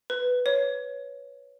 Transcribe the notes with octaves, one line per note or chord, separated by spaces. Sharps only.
B4
C#5